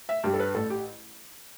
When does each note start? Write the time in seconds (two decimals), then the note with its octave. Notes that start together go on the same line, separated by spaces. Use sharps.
0.09 E5
0.23 G2 G3 G4
0.33 A4
0.40 B4
0.54 A1 A4
0.70 G4